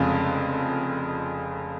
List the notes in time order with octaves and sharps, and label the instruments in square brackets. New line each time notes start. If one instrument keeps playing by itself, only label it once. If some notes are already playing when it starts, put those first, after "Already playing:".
Already playing: [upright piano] F1 F2 C#3 G#3 F5